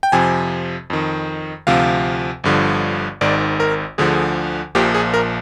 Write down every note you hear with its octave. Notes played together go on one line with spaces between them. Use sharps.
G5
F2 C3 F3 G#5
F2 D#3
D2 C3 F3 F5
G1 G2 D3 F3
G#1 G#2 D#3 D5
A#4
D2 D3 F3 G#4
A#1 A#2 F3 G4
G#4
A#4